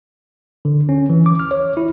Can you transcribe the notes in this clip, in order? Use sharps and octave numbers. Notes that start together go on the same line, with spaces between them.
D3
C#4
E3
D6
F6
C#5
E4